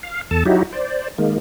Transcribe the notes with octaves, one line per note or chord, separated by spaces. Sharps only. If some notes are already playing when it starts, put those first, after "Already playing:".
F5
E2 A4 A5
F#3 D#4 E4 F#4 G4
C5 D5
D#3 G#3 A#3